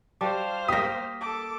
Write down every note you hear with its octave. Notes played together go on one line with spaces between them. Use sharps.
G3 F#4 C5 D5 F5 A5 D6
A#3 G4 D#6 A#6 B6
A4 D6